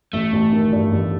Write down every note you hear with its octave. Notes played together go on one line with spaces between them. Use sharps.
A1 A3
A1
D#3
G2
A1